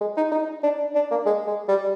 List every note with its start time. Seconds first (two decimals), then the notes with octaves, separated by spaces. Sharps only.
0.01 G#3
0.17 D#4
0.32 D#4
0.64 D4
0.95 D4
1.11 A#3
1.26 G#3
1.47 G#3
1.68 G3